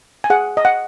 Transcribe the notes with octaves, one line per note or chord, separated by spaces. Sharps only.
G#5
G#4 F#5
D#5
F#5